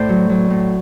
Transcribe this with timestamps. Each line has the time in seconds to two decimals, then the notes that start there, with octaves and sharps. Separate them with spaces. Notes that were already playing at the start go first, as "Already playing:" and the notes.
Already playing: A2 C5 D5
0.09 F#3
0.29 F#3
0.50 A2